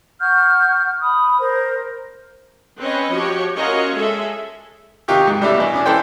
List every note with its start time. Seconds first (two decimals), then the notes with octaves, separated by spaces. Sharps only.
0.21 F#5 C#6 F6 G6
1.01 B5 D#6
1.39 A#4 C5
2.79 C4 C#4 B4 C#5 D#5
3.11 F3 F#4 G4 C#5
3.56 C#4 F4 F#4 A#4 C#5 D#5
3.96 G#3 G#4 A4 E5
5.08 C3 D#3 F4 G4 C#6 F#6
5.27 G#2
5.41 C3 G3 A3 D4 E4
5.56 B2 E3
5.74 C#4 D4
5.86 E3 A4 C5 G5